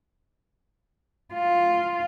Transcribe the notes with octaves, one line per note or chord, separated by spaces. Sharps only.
F4